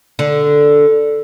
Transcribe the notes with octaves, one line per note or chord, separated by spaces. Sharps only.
D3